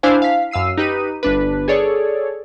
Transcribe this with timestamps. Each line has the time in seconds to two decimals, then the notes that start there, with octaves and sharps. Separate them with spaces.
0.03 D4 E4 C5 F5 G#5
0.22 F5 B6
0.51 F#2 F5 E6 C7 D#7
0.77 D#4 G4 B4 D#7
1.23 G1 D4 B4
1.68 G#4 A4 C#5 D5